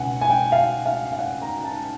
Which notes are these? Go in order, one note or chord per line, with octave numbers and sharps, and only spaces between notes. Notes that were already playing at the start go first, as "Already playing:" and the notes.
Already playing: C#2 B2 F#5 G#5
G#5
G5
F5
F5
F5
F#5
A#5
A5